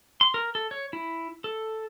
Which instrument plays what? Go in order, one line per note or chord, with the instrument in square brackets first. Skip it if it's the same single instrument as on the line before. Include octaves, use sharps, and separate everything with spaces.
[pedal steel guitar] C6
A#4
A4
C#5
E4
A4